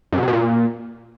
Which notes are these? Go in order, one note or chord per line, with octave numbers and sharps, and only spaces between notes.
F#2
B2
C3
B2
A#2